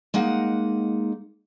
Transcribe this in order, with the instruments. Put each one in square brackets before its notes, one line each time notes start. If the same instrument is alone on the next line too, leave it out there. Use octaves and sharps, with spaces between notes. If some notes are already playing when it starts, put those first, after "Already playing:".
[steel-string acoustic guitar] G#3 A#3 D#4 F#5